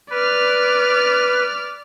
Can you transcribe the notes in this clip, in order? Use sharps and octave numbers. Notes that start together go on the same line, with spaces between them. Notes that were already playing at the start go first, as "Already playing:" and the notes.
B4 D5 F6